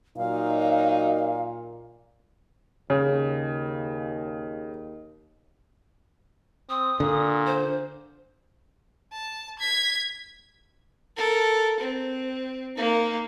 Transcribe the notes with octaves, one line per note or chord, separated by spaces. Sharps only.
A#2 F#3 D#4 F5
D#2 C#3
C4 D#6
A#2 D3
C5
A5
G#6 B6
A4 A#4
C4
A#3 D#4